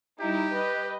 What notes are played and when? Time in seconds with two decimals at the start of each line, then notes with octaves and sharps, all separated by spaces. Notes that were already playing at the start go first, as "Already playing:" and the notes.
0.20 G3 D#4 E4 G4
0.53 B4 D#5